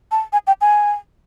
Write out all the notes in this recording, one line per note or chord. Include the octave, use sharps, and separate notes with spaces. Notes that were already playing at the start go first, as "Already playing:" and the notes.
A5
G#5
G5
G#5